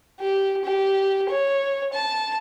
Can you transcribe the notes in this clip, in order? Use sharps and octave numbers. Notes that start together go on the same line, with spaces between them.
G4
G4
C#5
A5